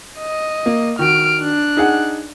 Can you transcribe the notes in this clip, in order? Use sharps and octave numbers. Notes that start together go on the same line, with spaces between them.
D#5
A#3
D#3 F#4 F6 D7
D4 F#6
D#4 G#4 F#5